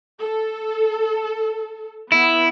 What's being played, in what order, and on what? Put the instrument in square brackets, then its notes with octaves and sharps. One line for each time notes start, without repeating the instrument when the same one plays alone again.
[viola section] A4
[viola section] B3 [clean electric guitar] E4